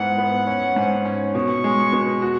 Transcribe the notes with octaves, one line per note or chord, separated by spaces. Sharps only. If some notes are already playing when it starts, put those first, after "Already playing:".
Already playing: G#2 B3 E4 F#5
B3
C#4
G#2
C#4
B2 C#6
G#3
B2
F#4